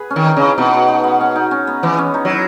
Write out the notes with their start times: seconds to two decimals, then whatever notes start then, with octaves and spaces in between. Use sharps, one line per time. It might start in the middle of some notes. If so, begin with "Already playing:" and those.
Already playing: G#4 B4
0.10 C#4
0.16 D#3
0.26 D#4
0.36 C#3
0.42 E4
0.57 B2 D#4
0.74 F#4
0.88 D#4
1.04 B3
1.21 C#4
1.36 D#4
1.51 C#4
1.67 B3
1.83 E3 B3
1.98 C#4
2.14 D#4
2.25 F#3
2.30 E4